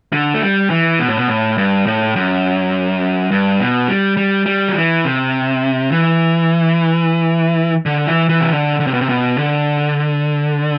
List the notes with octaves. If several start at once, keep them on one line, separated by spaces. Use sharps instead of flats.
D3
A3
G3
E3
B2
A2
B2
A2
G2
A2
F#2
G2
B2
G3
G3
G3
F#3
E3
C3
E3
D3
E3
E3
C3
D3
D3
C3
B2
C3
B2
D3